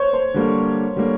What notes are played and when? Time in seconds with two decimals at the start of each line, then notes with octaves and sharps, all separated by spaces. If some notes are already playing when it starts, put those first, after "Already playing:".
Already playing: C5 C#5
0.13 C5
0.34 D3 G3 A#3
0.96 D3 G3 A#3